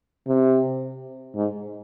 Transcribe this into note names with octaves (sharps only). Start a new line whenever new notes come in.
C3
G#2